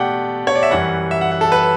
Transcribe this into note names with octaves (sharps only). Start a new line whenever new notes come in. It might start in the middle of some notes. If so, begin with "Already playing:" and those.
Already playing: B2 A3 G4 D5 F#5 G5
C#5
D5
E5
F#2 E3 G3 F#5
E5
F#5
F#5
A4
B4